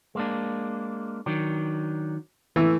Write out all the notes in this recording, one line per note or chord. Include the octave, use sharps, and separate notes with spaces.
G#3 A#3 D4
D#3 F#3 D4
E3 A3